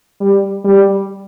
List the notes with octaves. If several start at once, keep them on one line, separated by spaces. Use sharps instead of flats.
G3
G3